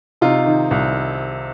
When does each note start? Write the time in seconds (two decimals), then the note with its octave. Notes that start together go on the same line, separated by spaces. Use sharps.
0.21 C3 D#4 F4
0.46 D#3
0.71 C2